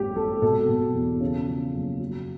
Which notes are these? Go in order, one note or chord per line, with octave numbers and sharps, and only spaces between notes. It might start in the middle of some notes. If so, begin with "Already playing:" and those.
Already playing: G#1 F#2 G4
G#1 A4
B2 A4
B2
E2
C#3
F3
F#1
F#3